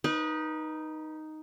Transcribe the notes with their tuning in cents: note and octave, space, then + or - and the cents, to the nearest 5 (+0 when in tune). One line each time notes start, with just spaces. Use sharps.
D#4 +0 B4 -30